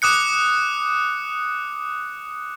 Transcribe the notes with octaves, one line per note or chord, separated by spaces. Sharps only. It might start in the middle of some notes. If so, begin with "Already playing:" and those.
D6 D#6 F#6 C#7